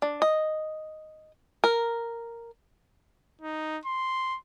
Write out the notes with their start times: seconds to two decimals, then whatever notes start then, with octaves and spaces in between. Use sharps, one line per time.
0.02 D4
0.22 D#5
1.64 A#4
3.41 D#4
3.86 C6